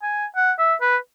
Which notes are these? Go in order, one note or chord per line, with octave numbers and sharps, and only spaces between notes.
G#5
F#5
E5
B4